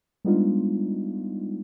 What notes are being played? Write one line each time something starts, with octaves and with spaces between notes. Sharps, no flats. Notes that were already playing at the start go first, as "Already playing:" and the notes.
G3 G#3 B3 D4 D#4 F4